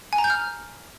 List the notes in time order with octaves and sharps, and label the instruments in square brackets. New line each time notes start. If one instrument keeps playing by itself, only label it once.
[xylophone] G#5
A#5
G6
F6